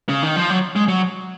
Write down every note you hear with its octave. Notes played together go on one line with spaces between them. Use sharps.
C#3
D#3
F3
F#3
G#3
F#3